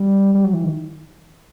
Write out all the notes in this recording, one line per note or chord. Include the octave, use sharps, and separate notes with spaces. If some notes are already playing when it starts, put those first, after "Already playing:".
Already playing: G3
G3
F#3
E3
D#3